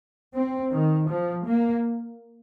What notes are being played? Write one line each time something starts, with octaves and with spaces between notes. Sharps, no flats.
C4
D#3
F3
A#3